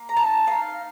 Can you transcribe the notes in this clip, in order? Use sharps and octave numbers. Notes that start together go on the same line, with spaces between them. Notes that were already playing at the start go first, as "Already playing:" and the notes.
Already playing: A#3
A#5
D#4 A5
D#4 F5